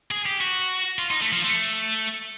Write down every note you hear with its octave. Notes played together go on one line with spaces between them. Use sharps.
G#4
G4
F#4
F4
D#4
A3
F3
A3